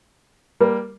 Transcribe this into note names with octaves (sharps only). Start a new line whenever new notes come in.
G3 A#3